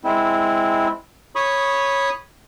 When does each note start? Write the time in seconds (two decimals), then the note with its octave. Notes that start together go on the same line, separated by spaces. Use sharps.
0.04 G#3 C4 E4
1.35 C#5 B5 C#6 D#6